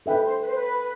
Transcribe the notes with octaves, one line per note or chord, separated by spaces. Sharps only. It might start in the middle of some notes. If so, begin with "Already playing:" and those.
D4 A4 B4 E5 G5
C5
B4
C5
B4